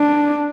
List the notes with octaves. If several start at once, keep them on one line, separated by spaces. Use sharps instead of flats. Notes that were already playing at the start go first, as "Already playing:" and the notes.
Already playing: D4